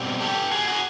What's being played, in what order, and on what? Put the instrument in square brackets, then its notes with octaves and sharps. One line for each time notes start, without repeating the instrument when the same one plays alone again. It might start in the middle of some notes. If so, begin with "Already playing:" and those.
Already playing: [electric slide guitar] B2 G3 C4
G4 A4
F#4 G#4
F#4 G#4